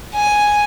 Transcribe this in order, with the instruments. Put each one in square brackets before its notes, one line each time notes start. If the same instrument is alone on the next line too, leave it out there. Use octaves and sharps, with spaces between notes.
[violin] G#5